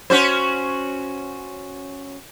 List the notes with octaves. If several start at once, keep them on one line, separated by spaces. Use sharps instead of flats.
C#4 F#4 C5